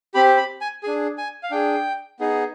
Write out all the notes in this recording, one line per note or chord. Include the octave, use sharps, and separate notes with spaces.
C4 G4 B5
B5
G#5
D4 G#4 G#5
G#5
F5
D4 G#4 G5
B3 D#4 G#4